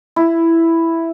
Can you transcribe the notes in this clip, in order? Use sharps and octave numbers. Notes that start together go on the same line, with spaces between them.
E4